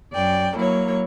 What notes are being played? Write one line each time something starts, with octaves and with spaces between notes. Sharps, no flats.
F#2 D5 G5
F#3 A#3 E4 C#5